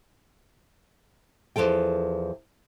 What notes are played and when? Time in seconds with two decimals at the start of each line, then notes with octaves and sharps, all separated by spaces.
1.56 E2 G#2 F3 A4 G5